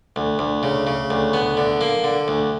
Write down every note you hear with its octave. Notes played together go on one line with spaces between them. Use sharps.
D2
D2
C#3
C#3
D2
B3
D3
A#3
D3
D2